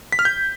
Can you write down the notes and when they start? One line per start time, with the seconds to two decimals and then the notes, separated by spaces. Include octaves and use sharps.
0.12 B6
0.19 F6
0.25 G6